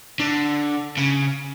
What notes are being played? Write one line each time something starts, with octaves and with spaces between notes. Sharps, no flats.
D3
C#3